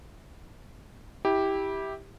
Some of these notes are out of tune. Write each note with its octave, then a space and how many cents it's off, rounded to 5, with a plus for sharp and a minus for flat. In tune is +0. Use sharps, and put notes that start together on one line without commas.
E4 -20 G4 +0